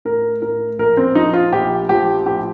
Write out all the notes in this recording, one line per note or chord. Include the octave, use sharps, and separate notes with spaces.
A2 A#4
A2 A#4
A#1 A#4
C4
F3 D#4
F4
A#1 G4
F3 G4
A2 G4